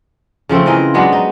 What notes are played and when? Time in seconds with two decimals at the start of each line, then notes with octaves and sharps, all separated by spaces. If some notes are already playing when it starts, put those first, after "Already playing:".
0.49 C#3 F3 A3 C4
0.66 E3 F4 A#4 D#5
0.94 F#3 G#3 B3 D4
1.12 D#4